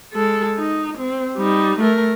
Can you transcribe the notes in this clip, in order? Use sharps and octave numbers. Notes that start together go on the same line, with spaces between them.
G#3 A4
D#4
C4
G3 D#4
A3 A#4